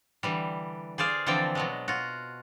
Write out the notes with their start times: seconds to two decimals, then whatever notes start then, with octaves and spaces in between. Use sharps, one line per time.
0.23 D3 E3 G3
0.98 G#4 C5 D5 F5
1.26 D3 E3 F3 C4 D5 G5
1.55 B2 F#3 G#3
1.88 F4 F#4